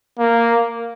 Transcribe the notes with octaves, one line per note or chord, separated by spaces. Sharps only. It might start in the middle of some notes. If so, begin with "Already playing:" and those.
A#3